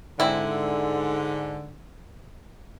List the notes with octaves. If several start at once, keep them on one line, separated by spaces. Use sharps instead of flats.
G#2 D3 C4 E4